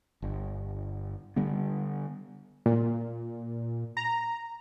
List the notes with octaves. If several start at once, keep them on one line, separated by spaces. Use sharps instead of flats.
G1
D3 G3 B3
A#2
A#5